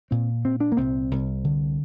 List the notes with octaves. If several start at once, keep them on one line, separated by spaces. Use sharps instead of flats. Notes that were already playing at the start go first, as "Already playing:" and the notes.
A#2 C4
A#2 C4
D4
A#3
C2 C4
C2
D3